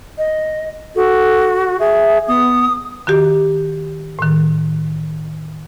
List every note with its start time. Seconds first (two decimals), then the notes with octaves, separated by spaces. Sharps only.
0.18 D#5
0.96 F#4 A4
1.80 G#4 E5
2.28 B3 D#6
3.07 D#3 F#4 G4
4.19 A2 D#3